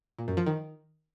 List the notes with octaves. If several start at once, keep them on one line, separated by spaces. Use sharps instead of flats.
A#2
F#2
F3
D#3